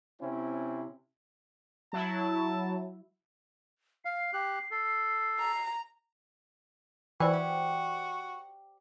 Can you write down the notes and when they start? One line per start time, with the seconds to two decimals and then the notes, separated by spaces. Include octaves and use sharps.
0.21 C3 C4 C#4 E4
1.93 F#3 E4 A5
4.05 F5 C7
4.33 G4 F#6
4.71 A4
5.39 A#5
7.20 E3 F#4 C5 D5 G5
7.34 G4